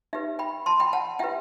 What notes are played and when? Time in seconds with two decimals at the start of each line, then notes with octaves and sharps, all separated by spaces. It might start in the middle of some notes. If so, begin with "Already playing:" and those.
0.13 D#4 G4 B4 E5
0.39 G5 B5
0.66 A5 C6
0.80 G5 B5
0.93 F#5 A5
1.19 E4 G4 B4 E5 G5